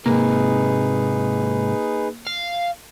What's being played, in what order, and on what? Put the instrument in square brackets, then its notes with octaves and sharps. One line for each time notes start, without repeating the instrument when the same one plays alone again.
[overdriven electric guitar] G#2 C3 [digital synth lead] A#3 [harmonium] D#4 G#4 B4
[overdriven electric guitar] F5